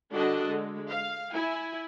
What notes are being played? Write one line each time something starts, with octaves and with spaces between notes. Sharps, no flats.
D3 G3 D4 F#4 A4 D#5
D3 G#3
F5
E4 G#5